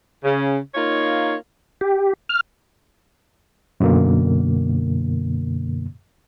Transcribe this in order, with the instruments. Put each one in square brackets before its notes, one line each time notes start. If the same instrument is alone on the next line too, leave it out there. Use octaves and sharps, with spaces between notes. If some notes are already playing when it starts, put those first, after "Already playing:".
[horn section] C#3
A#3 D#4 F4 C#5
[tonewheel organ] G4
F6
[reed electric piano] F#2 B2 D3 A#3